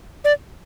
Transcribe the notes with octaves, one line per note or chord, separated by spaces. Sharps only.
D5